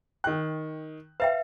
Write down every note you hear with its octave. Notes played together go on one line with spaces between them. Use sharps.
D#3 G5 F#6
B4 E5 F5 G5